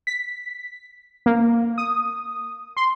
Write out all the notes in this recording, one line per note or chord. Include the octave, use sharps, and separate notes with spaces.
B6
A#3
D#6
C6